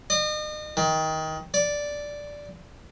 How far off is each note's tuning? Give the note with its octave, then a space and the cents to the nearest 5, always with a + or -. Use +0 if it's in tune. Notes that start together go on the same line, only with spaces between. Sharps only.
D#5 -40
D#3 +20
D5 -5